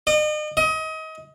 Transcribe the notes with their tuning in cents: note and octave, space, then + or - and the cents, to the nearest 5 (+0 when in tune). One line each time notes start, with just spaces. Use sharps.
D#5 -40
D#5 +30